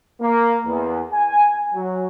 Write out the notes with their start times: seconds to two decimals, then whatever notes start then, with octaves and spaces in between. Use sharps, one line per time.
0.20 A#3
0.66 E2
1.12 G#5
1.74 F#3